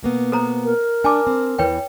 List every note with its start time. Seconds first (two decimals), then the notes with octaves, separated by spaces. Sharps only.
0.03 B2 A#3 B3
0.32 A4 C5 A#5
0.65 A#4
1.04 D4 G#5 A5 D6
1.27 C4
1.59 E2 E3 B4 C#5 G5